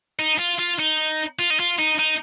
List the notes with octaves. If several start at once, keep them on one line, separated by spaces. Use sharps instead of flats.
D#4
F4
F4
D#4
F4
D#4
F4
D#4
D#4